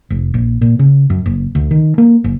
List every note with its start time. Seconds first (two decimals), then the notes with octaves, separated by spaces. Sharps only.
0.10 F1
0.34 A#1
0.61 A#2
0.79 C#3
1.10 F#2
1.26 F#1
1.55 D2
1.71 D#3
1.98 A#3
2.24 F#1